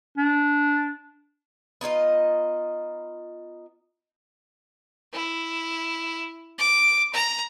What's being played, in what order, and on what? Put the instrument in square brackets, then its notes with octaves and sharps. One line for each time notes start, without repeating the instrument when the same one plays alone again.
[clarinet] D4
[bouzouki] B3 D#4 F4 D#5
[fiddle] E4
D6
A#5